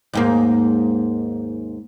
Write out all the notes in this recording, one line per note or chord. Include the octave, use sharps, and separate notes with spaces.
D#2 G#2 A#3